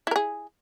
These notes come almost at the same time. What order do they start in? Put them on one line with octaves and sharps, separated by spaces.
E4 A#4 G#4